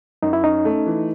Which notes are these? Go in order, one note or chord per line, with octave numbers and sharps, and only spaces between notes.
F#2 D#4
E4
C#4 D#4
A3
E3